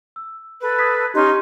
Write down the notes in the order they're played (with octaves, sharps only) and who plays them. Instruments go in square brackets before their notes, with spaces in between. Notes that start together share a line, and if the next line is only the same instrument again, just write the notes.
[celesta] E6
[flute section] A4 B4
[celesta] D#6 G#6 B6
[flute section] C#4 D#4 C6 [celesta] G4